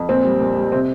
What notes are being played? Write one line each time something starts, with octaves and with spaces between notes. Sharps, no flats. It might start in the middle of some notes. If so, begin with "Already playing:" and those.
Already playing: F2
A#2 C4
G3
A#2
G3
C3 C4